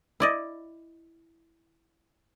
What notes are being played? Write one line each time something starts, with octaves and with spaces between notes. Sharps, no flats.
E4 D5 D#5